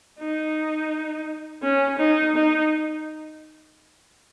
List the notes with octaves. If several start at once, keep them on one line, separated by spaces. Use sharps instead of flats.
D#4
C#4
D#4
D#4